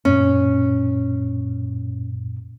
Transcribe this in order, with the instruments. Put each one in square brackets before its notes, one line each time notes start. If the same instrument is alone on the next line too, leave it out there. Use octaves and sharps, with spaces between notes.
[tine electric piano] F#2 A#2 [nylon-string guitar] C#4